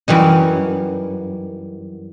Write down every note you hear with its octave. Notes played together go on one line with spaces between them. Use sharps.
F#2 E3 G3 D#4